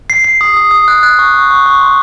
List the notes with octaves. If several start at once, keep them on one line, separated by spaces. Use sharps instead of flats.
C7
C7
D#6
D#6
D#6
F#6
F#6
C#6
C#6
C#6
C#6
C6